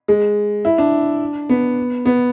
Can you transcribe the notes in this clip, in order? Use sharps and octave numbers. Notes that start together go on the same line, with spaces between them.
G#3
E4
D4
B3
B3